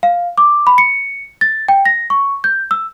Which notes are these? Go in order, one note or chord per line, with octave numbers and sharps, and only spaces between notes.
F5
D6
B5
C#7
A6
G5
A#6
C#6
G6
E6